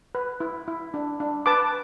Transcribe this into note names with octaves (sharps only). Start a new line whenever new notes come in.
B4
E4
E4
D4
D4
B4 A5 D6